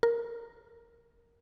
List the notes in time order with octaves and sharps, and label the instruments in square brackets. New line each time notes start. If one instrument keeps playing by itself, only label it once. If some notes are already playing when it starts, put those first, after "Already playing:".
[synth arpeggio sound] A#4